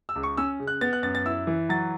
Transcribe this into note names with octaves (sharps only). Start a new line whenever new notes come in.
E6
C#2
C#6
C#4 E6
C#3
F#6
B3 A6
F#6
F#2 A6
A6
E4 E6
E3
F#3 A6